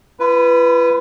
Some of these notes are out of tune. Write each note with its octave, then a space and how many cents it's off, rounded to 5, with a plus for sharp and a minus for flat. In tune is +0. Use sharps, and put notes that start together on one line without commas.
F4 -45 B4 +0